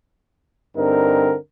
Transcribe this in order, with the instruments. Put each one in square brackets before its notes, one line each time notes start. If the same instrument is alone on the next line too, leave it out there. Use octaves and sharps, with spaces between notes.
[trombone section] G2 D3 C4 D#4 A#4